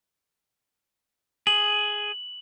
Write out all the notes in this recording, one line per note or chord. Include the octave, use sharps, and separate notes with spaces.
G#4 F#7